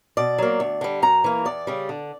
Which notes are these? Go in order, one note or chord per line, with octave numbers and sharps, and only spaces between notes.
B2 D5
F#3 A#3
D2
D3 G3
F#2 A#5
E3 A#3
E2 D5
C#3 G3
D3